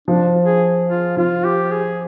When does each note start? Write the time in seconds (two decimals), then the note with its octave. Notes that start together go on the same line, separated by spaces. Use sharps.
0.08 F3 D4
0.45 G#4
0.90 F4
1.17 F3 F4
1.45 G4
1.71 G#4